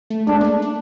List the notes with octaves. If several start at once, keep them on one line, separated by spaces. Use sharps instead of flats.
A3
G#3 D4
A#3
A3
D4